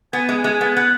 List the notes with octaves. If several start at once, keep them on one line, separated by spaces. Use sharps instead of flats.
B3 G#5
G#3
G#5
G#3
B3
G#5
B3 F#5